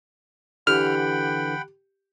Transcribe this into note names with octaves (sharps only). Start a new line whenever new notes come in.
D3 E3 G4 F#5 G5 B5 F6